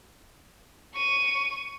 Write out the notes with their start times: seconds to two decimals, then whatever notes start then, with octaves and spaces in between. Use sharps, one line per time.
0.95 C#6 D#7